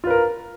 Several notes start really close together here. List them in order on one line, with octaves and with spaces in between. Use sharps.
F4 B4 A#4